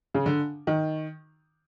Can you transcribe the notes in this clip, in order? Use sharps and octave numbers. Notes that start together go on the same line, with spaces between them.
C#3
D3
D#3